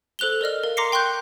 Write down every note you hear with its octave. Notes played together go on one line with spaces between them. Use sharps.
A4 C5 F#6 F7 G7
A#4 D5 D#5 F6
A#4 F5
A#5 C6 D6 A#6 C7 C#7
G5 C6 C#6 F#6 G6